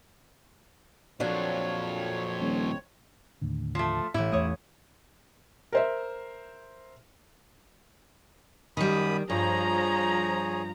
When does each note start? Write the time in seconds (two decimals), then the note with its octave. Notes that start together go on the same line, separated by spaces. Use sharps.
1.20 F2 A#2 F3 F#3 A#3 D4 C#5
2.40 D#1
3.41 D#2 A2 D3
3.75 F3 A3
4.14 A1 A2 E4 G4
4.32 E2 A3 C#5 D#6
5.72 A#4 C5 E5
8.77 F#2 D#3 G3 B5 D#6
9.30 G2 F3 G#4 C#5 A#5